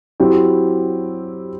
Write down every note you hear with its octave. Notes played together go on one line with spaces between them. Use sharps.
F#3 C4 E4 G4